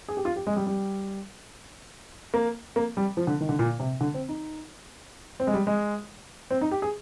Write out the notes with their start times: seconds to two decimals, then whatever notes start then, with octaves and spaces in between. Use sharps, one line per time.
0.08 G#4
0.17 G4
0.25 F4
0.36 G4
0.47 G#3
0.56 G3
0.67 G3
2.34 A#3
2.76 A#3
2.97 G3
3.17 F3
3.27 D3
3.41 D#3
3.49 D3
3.59 A#2
3.80 C3
4.01 D3
4.14 C4
4.29 D#4
5.40 C4
5.47 G#3
5.54 G3
5.67 G#3
6.51 C4
6.61 D#4
6.71 G4
6.82 G#4